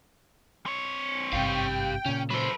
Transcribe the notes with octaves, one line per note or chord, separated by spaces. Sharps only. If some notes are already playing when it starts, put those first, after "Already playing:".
C4 C#5
G#1 G2 C3 G4 F5 G5
A#2 C#3 C#4
F#3 A4 B4 C5